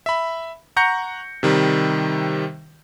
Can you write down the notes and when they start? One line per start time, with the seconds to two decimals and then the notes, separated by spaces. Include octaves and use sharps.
0.06 E5 B5
0.76 F#5 A#5 C#6 G6 A#6 C#7
1.43 C3 D#3 G3